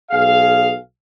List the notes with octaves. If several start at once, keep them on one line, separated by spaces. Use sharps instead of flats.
B1 G#4 F5